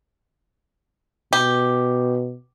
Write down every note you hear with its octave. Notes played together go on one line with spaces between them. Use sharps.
B2 G4